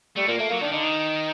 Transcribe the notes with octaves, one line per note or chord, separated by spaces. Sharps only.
G3 A3
A#2 A#3
A3 A#3
F#3 A#3
D#3 D4
D3 D#4
D#3